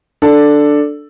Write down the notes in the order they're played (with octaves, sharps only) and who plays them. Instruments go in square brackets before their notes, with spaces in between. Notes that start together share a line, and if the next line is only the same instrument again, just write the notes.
[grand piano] D4 A4